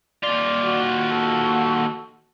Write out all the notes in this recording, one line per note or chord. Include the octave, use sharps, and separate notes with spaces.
D#2 F4 D5
F#4
A4